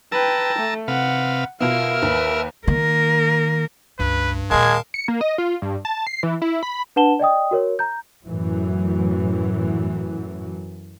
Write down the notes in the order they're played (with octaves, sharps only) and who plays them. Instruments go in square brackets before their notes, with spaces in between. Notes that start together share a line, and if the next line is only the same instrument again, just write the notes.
[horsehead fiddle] B4 G5 [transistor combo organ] A5 A#5 E6
[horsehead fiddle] A3
[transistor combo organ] C3 B4 F5 [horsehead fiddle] F#5
[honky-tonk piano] B2 B3 [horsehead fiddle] F4 F5 [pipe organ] A#4 F6 [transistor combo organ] E5
[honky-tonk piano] D#2 [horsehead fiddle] B4
[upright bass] D#3 [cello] A#3 A#4
[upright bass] C#2 [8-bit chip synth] G2 [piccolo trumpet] B4
[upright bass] D#2 A#2 [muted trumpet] G#3 [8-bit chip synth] A#4 F5 A5 [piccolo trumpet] G#6
[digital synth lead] C#7
A#3
D#5
F4
G2
A5
C7
E3
E4
B5
[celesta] D4 B4 F#5 A5 E7 G7
D5 D#5 G5 D#6
F#4 A#4 C#5
A#5 G6
[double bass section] F#2 A2 E3 F#3